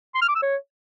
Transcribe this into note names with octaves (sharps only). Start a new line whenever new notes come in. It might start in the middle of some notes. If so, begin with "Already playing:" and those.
C6
F6
D6
E6
C#5